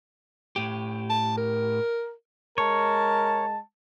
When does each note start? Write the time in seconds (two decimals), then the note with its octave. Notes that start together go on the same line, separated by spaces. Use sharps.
0.56 A2 G4
1.10 A5
1.37 A#4
2.58 G#3 A#4 C#5 A5